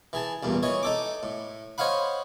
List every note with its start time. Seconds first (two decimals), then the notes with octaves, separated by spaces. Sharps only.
0.13 E3 G#4 A5
0.43 A1 E2 G2 A#2
0.63 E3 C#5 D#5
0.83 D#4 A4 D6
1.23 A2
1.78 C5 C#5 D#5 F5 F#5 B5